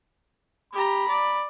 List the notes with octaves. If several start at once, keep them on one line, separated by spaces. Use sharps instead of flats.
G4 A#5 B5
D5